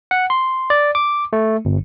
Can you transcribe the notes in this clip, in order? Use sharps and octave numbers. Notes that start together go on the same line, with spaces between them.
F#5
C6
D5
D6
A3
G1